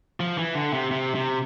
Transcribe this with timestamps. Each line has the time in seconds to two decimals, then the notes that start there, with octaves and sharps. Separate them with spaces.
0.20 F3
0.38 E3
0.55 D3
0.73 C3
0.91 C3
1.15 C3